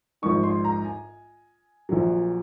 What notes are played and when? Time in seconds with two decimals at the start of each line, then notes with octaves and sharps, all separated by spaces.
0.22 A#1 G#2 D#3 C#6
0.43 C6
0.65 A#5
0.84 G#5
1.89 A#1 A#2 F#3